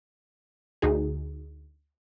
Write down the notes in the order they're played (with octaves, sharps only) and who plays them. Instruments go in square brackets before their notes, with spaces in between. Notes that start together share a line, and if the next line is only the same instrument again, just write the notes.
[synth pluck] D2 D#4 F#4 G#4